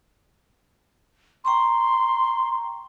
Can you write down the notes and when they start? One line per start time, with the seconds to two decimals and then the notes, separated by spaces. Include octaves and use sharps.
1.45 G5 A#5 C6 C#6